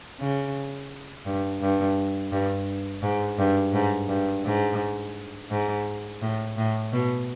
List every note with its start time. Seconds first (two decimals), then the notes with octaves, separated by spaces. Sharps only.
0.20 C#3
1.26 G2
1.61 G2
2.32 G2
3.03 G#2
3.38 G2
3.74 G#2
4.09 G2
4.45 G#2
5.51 G#2
6.22 A2
6.57 A2
6.93 B2